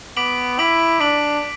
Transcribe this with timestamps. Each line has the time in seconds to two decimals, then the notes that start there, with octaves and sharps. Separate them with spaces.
0.17 B3 D6 B6 D7 F#7
0.59 E4 D6 B6 D7 F#7
1.00 D4 D6 B6 D7 F#7